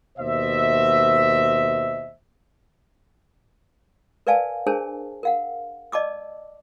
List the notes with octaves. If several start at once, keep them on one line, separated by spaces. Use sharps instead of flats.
D#2 B2 C5 D#5 E5
A#4 B4 D5 F5 G#5 A5
D4 G#4 A#4 C5 G#5 A5
A#4 F5 F#5
D5 D#5 A5 D6 E6